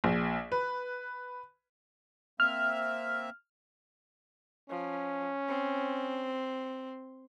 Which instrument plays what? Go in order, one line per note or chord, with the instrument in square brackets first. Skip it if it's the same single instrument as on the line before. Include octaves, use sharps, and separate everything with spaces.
[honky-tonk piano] A#1
B4
[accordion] A#3 C4 E5 [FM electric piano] F6
[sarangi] F3 [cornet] C#4
[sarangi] C4